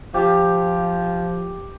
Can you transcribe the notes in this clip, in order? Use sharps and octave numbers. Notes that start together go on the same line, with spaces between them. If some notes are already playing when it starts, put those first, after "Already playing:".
F3 G4